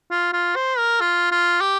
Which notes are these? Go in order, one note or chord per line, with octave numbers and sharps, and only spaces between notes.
F4
F4
C5
A#4
F4
F4
G4